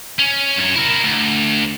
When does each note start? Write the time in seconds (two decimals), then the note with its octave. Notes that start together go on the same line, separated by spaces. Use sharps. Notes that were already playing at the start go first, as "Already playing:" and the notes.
0.19 C#4
0.57 F#2 C#5
0.76 E4 A#4
1.04 D2